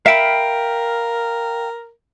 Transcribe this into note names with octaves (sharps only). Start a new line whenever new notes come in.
A#4 E5 F5 G5 B5